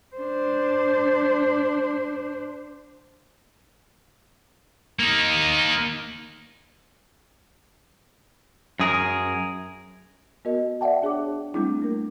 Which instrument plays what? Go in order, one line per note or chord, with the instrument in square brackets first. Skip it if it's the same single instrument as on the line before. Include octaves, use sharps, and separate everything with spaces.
[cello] D4 C5
[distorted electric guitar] A#3 D#4
[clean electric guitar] F#2 G#4 A#4
[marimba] B3 F#4 A#4 D#5
D5 E5 F#5 G5 A5
D4 G#4 C#5 D6
G3 A3 C4 D4 E4 G#4
A#3 A#4